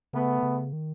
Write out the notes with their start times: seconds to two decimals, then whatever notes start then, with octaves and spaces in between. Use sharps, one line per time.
0.13 C#3 A3 B3
0.43 C#3
0.73 D#3